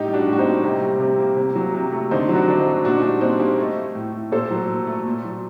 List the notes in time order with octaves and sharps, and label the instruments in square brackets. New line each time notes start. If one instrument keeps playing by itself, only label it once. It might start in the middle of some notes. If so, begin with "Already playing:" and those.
Already playing: [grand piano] A2 D#4 G4
G3
D4 F#4
A2
F#4
C4 D#4
A#3
C3 C4
G3
C3
A#3
C3
F#3
C3
A3
D3 C4 D#4
F#3
D4 F#4
D3 D4
C4 D#4
A3
A#2 D4 F#4
D#4
G3 D4
A#2 C4 D#4
A#3 D#4 G4
A3
A3
A2
A2
A#2 A4 C5
F#3
A#2
A3
A#2
F#3